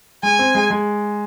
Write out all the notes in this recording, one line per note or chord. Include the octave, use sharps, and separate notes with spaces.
G#3 G#5
C4
G#3
G#3